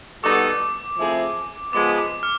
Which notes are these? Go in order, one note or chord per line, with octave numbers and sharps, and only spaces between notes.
G3 B3 D#4 F#4 A4 D6
F3 A3 C4 E4 G#4
F3 G#3 B3 D6
D6
F6